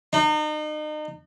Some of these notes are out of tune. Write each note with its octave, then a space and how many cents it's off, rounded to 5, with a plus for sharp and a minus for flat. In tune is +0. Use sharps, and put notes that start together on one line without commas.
D#4 -35